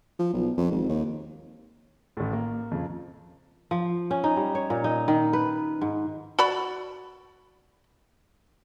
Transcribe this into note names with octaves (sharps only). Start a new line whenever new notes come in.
F3
B1
F2
G#1
D#2
A1 A2
A#3
F2 C#3
F3
C#4
D#4
G3
C#5
A#2
D#4
D#3
B4
G#2
F#4 D5 B5